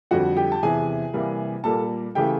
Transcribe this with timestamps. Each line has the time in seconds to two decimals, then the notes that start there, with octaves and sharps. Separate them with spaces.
0.11 F2 D3 G3 F#4 F#5
0.37 G4 G5
0.52 A5
0.63 E2 C3 E3 G#4 G#5
1.14 C3 E3 G3 A#3
1.64 A#2 G3 A#3 A4 A5
2.15 C#3 E3 A3 G4 G5